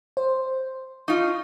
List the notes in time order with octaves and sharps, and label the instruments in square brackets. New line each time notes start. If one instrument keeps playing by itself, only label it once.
[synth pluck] C5
[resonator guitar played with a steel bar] D#4 F4 [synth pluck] C#6